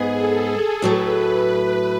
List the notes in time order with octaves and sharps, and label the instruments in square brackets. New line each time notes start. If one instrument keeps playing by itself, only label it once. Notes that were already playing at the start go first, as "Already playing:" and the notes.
Already playing: [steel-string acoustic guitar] G#2 G#3 B3 [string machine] G#4
[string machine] A4
[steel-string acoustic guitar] A2 F#3 A3 [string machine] B4
[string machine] B4